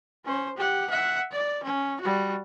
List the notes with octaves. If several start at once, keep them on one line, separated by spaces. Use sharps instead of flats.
C#4 C5
G4 F#5
E5 F#5
D5
C#4
G3 F#4